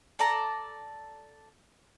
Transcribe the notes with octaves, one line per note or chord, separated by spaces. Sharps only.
A4 D5 A5 A#5